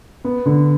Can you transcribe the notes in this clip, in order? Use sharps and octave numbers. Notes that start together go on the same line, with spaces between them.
B3
D3